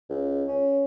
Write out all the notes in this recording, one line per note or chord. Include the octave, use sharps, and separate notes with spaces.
C#2
C#4